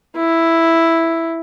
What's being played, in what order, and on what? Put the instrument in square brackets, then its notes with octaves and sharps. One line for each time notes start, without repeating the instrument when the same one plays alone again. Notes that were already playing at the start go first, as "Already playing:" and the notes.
[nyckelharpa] E4